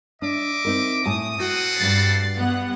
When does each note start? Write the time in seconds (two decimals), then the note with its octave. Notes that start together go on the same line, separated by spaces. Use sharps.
0.22 D4 D#5 E5 D6
0.65 C4 D#4 A#4
1.06 A2 G#5 A5 D#6
1.40 C4 F#4 A4 F#5
1.77 G2 A6 C7
2.37 G2 B3 F#5